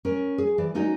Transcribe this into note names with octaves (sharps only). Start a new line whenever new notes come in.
C#4 A#4
G#4
E3 D5
C#4 D#4 F#4 A#4 D5 D#5